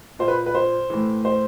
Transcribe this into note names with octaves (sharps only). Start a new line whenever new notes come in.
A#2 C5
B4
B4
C5
A2 E3
C5